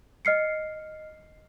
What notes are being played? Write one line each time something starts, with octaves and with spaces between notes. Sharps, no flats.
D#5 F6 C7 C#7